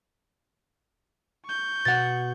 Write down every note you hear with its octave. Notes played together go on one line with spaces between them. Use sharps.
C#6 G6
B2 F#5 A6